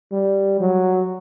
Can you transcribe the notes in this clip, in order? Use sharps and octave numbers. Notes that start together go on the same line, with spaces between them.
G3
F#3